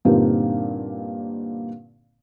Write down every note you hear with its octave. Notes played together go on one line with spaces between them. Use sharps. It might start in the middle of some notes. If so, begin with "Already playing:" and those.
G2 A#2 D3 C4 D#4 G4